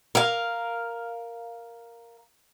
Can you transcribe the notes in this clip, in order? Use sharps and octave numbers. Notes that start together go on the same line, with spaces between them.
A#4 F5